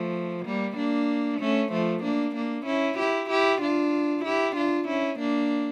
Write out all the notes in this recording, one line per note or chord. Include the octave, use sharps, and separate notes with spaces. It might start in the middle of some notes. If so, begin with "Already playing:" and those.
Already playing: F3 A3
G3 A#3
A#3 D4
A3 C#4
F3 A3
A#3 D4
A#3 D4
C#4 E4
E4 G4
E4 G4
D4 F4
E4 G4
D4 F4
C#4 E4
A#3 D4